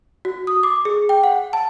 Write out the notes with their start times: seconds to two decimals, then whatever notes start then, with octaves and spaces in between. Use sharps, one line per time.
0.25 F#4
0.47 D#6
0.63 D6
0.85 G#4
1.09 G5
1.23 F#5
1.53 A5